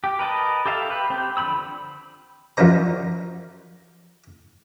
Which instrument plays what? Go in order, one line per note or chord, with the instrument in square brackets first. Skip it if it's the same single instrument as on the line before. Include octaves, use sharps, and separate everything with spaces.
[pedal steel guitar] G4
A#4 B4 D#5 A5
G4 A4 E5 F5
G4 B4
C4 G4
D3 F3 A#3 B5 E6
[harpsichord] F#2 F3 D4 D#4 C5 A#5